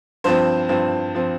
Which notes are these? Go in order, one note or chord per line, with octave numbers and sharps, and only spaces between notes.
G2 F3 C4 C5
G2 F3 C4
F3 C4